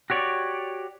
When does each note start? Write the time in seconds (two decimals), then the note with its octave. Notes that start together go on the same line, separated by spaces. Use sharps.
0.10 F#4 G4 C#5 D5